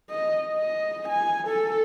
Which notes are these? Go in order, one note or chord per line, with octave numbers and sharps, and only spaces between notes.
D#5
D#5
G#5
A4